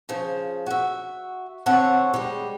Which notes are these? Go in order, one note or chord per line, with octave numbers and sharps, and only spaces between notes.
C#3 F3
F#4 E5
D3 C4 A4 C#5 F#5
G3 G#3